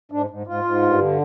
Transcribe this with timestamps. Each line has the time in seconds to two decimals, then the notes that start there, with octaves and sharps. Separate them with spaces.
0.12 G#2 D4
0.30 G#2
0.47 G#2 F4
0.64 G#2
0.82 G2
0.99 D3